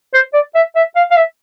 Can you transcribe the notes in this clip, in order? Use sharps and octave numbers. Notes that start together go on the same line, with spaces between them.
C5
D5
E5
E5
F5
F5
E5